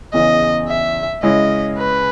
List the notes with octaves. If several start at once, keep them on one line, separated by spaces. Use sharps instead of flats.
E2 C#3 E3 D#5
E5
C#3 G#3 C#4 E4 D#5
B4